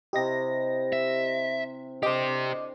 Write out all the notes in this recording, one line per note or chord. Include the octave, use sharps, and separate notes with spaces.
C3 E4 G4 D#5 A#6
E5
D4 G4 A4 C5 D#5 G5 D6